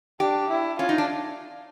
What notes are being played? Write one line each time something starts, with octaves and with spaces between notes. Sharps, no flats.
D4 G4
E4
C#4 F4
D#4
D4